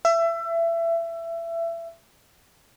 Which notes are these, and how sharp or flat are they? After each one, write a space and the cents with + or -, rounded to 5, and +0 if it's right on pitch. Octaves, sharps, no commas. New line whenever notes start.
E5 +25